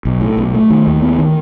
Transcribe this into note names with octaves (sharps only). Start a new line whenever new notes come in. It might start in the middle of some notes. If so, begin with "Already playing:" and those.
B1
A2
B1
A3
D#3
D#2
B3
D#3